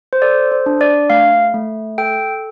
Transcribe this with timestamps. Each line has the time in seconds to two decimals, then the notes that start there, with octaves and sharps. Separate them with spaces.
0.13 C5
0.22 A4 D5
0.52 C5
0.66 D4
0.81 D5
1.10 A3 F5
1.54 A3
1.98 A4 G5